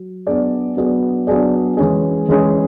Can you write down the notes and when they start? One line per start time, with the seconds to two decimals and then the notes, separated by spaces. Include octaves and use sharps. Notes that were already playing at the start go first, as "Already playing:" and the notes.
Already playing: F#3
0.27 F#3 B3 D4 G#4 D5
0.77 F#3 B3 D4 G#4 D5
1.27 F#3 B3 D4 G#4 D5
1.77 E3 G#3 C#4 G#4
2.28 E3 G#3 C#4 G#4